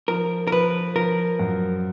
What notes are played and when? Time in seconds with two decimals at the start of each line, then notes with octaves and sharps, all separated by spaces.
0.08 F3 A#4
0.47 A#4
0.52 F3 B4
0.95 F3 A#4
1.39 F#2